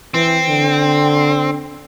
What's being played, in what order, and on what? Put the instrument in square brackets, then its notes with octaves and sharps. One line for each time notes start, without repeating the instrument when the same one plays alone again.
[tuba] E3 [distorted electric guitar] C4
[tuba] D3